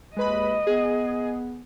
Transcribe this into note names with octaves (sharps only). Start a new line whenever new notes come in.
D#2 G#3 B4 D#5 B5
B3 G#4